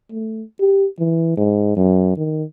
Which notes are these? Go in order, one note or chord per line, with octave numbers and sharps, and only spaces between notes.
A3
G4
E3
G#2
F#2
D#3